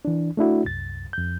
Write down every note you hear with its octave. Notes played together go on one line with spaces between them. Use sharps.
E3 D4
A3 D4 E4 F#4
C2 F#2 A6
F2 G6